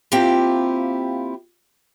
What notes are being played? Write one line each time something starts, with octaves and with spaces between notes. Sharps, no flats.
A#3 C4 E4 F4 G4 G5